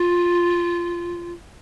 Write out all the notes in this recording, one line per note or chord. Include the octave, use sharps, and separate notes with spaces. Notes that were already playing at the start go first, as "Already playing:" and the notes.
Already playing: F4